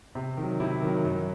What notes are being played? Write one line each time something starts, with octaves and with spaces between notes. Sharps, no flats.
C3
D#3 F#3
C3 E4
D#3 F#3
F#2